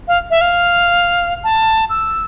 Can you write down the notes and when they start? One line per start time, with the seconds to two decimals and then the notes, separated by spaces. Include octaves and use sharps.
0.08 F5
0.30 E5
0.41 F5
1.44 A5
1.90 E6